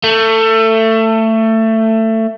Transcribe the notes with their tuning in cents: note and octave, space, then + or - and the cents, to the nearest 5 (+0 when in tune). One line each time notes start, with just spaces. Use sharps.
A3 +20